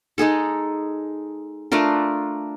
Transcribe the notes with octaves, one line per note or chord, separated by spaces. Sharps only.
G#3 D#4 G#4 A4
A3 D4 F4 A#4